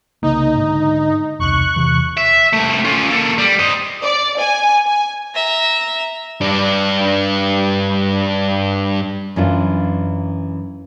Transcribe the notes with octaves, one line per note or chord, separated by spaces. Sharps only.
C2 C#3 A#3 D#4
G#2 D3
E1 C2 C#6 F#6
E2 C3 E3
E5
C2 A3
C#4 F4
A#3 A4
G3
C5 D#5
D5
G#5
G#5
E5 A#5
G2 D4
F#2 E3 C#4 D4 F4